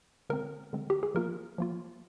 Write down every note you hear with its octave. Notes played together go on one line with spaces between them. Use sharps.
D3 G#3 C4 A#4
D3 G#3 C4
G4
G#4
F3 A#3 F4 A#4
F3 A#3 F4